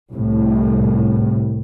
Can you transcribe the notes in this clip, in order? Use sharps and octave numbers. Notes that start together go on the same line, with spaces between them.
C2 A2